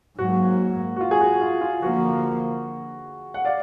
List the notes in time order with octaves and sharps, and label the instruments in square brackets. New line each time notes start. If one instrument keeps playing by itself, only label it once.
[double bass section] G#2 F#3 A#3 [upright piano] F#4
[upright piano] F#4
F4
G#4
F#4
F4
F4
[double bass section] D3 F3 A#3 [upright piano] F#4
[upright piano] F#5
D5 F5